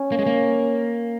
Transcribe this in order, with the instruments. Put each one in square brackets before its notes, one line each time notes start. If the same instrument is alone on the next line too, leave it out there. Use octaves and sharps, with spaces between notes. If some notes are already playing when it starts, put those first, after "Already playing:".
Already playing: [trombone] C#4
[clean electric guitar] A#3
G#3
A#3